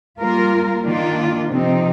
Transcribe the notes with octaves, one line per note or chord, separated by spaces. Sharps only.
G3 A#3 F4 A#4
D#3 A#3 D4 F4
C3 F3 C4 D#4